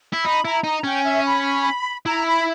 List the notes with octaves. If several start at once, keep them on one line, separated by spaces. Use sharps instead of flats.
E4
D#4 B5
E4 A#5
D#4 A#5
C#4 G5
E5
B5
E4 A#5
B5